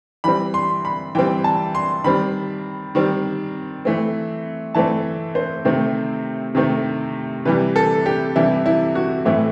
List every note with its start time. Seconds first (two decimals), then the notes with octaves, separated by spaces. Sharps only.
0.24 E3 G3 C4 B5
0.54 C6
0.85 B5
1.15 E3 G3 C4 G5
1.44 A5
1.75 C6
2.04 D#3 G3 C4 B5
2.95 D#3 G3 C4
3.85 E3 A3 C4
4.74 E3 A3 C4 A5
5.35 C5
5.65 C3 D#3 A3 C4
6.55 C3 D#3 A3 C4
7.45 C3 E3 G3 B4
7.76 A4
8.06 G4
8.36 C3 E3 G3 E4
8.66 E4
8.95 F#4
9.25 A2 E3 A3 C4 E4